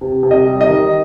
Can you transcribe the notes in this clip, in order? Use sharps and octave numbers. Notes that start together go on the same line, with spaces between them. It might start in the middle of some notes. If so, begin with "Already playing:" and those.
C3
C3
D#5
G3
D#5
D#3